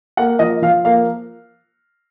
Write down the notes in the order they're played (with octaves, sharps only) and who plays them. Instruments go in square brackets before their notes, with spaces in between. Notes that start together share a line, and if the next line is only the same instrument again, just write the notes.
[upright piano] A#3 F#5
F3 D#5
F3 F5
A#3 F5